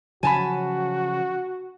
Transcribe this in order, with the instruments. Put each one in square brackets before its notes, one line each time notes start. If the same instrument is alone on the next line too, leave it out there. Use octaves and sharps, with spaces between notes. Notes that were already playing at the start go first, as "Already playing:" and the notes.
[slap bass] C#3 F3 F#3 [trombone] F#4 [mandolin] G#5 A5 B5